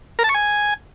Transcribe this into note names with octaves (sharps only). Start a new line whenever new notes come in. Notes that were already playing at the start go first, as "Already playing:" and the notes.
A#4
A5
C#6
G#5